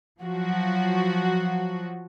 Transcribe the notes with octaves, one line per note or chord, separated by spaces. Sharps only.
F3 F#3 F#4